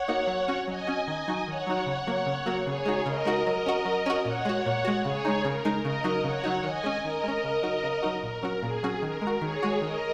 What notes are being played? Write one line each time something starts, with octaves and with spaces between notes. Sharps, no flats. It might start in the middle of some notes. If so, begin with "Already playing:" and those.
Already playing: C#5 F#5
A#3 D#4 F#4
F#3
C#4 F#4
F#3 D#5 G#5
C#4 F#4
D#3
F#3 D#4 F#4
D#3 C#5 F#5
F#3 D#4 F#4
C#3
F#3 A#3 F#4
C#3
F#3 A#3 F#4
C#3 G#4 C#5
G#3 D#4 F#4
C#3 A#4 D#5
G#3 D#4 F#4
F#3 A#4 D#5
C#4 F#4
F#3
C#4 F#4
A#2 C#5 F#5
G#3 F#4
A#2
G#3 F#4
C#3 G#4 C#5
G#3 D#4
C#3 A#4
G#3 D#4
C#3 A#4 D#5
F#3 D#4 F#4
C#3 C#5 F#5
F#3 D#4 F#4
D#3 D#5 G#5
G#3 C#4
D#3 A#4 D#5
G#3 C#4
C#3
F#3 D#4 F#4
C#3
F#3 D#4 F#4
A#2 A#4
F#3 C#4 F#4
A#2 G#4
F#3 C#4 F#4
D#3 A#4
G#3
F#4
D#3 G#4 C#5
G#3 F#4
D#3 A#4 D#5